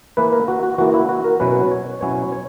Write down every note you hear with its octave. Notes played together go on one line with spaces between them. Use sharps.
E3 A#3 E4 B4
A#4
F#4
F#4
E3 A#3 E4 F#4
E4
F#4
A#4
B2 F#3 C#4 E4 B4
C#5
B2 F#3 C#4 E4 C#5
C#5